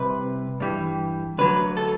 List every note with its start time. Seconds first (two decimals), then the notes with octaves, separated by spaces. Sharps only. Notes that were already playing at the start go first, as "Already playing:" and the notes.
Already playing: C2 C3 B4
0.60 G2 E3 G3
1.38 D2 D3 F#3 B4
1.77 A4